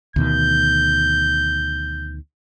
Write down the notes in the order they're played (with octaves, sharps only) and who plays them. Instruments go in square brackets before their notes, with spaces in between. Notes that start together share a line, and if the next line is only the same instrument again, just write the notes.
[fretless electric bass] D2 B2 D#3 [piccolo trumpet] G6